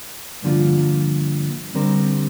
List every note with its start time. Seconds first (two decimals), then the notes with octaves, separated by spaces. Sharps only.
0.42 G2 D3 F3 A#3 F4
1.74 D3 G3 C4 G4 A#4